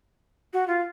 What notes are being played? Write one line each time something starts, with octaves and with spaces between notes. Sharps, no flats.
F#4
F4